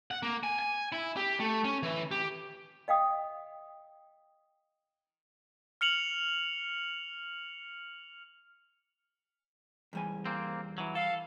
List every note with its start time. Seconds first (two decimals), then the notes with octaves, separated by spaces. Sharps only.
0.11 F#5
0.23 A#3
0.43 G#5
0.59 G#5
0.92 E4
1.17 G4
1.40 A3
1.65 C#4
1.83 E3
2.11 G4
2.88 D#5 F5 G5 D#6
5.81 F6 C#7 F7 F#7
9.93 E2 G3 G#5
10.26 A#3 C4
10.78 E3 F#3
10.95 A4 F5